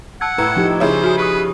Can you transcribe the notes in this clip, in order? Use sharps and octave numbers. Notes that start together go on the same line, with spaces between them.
F#5 A5 E6 G#6
A2 B4 A#5 E6
F3 D#4 G4
C#3 E4 G#4 C5 C#5
F#4 G#5 D#6
G4 B4 C#6 D#6